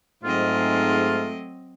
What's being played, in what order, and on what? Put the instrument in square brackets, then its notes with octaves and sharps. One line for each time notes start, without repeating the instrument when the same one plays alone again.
[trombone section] G#2 [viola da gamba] F#3 C4 D#5 [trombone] A3 [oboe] F4